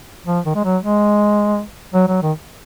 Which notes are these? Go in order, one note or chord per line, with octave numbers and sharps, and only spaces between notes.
F3
D#3
G#3
F#3
G#3
F#3
F#3
D#3